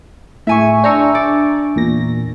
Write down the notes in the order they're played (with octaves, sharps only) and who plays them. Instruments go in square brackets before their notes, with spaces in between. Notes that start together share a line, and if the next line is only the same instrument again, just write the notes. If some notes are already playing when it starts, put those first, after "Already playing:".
[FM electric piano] A2 [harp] E5 G#5 C#6
[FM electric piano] D4 A#5 C#6 [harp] C5 E6
[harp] D5
[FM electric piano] E2 A#2 A#6